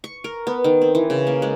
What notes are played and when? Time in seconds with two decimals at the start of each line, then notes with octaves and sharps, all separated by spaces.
0.04 C#6
0.24 A#4
0.47 B3
0.64 D#3
0.82 C4
0.95 E3
1.10 C#3
1.27 A#3
1.42 G#3